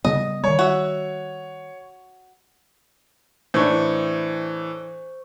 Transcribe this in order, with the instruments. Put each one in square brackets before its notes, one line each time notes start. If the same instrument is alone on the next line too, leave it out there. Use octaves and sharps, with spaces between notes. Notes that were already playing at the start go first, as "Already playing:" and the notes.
[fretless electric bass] C#3 G3 B3 [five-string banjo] D#5
[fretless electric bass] D#3 G3 [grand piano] C#5
[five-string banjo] F#4 E5
[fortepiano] A2 D4 [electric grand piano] E3 [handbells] C5 C#6